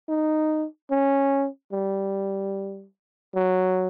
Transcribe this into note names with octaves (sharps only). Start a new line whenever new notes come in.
D#4
C#4
G3
F#3